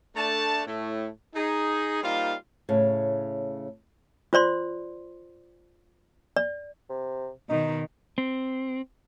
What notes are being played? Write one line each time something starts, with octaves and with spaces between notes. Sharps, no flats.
A3 D4 A5
A2 A3
D#4 G#4
G3 A#3 D#4 F4 C5 F5
A2 C#3
F4 C5 D5 C6
D5
C3
B2 D#3 D#4
C4